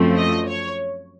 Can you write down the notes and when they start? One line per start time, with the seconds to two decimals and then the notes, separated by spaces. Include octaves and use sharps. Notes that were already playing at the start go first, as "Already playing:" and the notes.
Already playing: F#2 F3 A3 C4
0.18 D#5
0.48 C#5